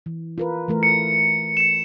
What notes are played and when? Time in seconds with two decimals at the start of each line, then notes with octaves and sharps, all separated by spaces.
0.06 E3
0.38 F4 A#4 B4
0.68 E3 A3 A#4
0.83 C#7
1.57 C#7 E7